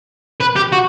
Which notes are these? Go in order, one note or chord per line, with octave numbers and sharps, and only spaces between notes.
B4
G4
F#4